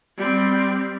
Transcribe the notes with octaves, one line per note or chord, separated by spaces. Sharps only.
G3 C4